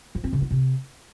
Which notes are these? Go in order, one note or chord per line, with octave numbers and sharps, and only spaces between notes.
F3
C4
C#3
B3
C3